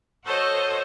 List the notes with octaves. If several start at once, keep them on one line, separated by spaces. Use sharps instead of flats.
F#4 A4 C5 C#5 D#5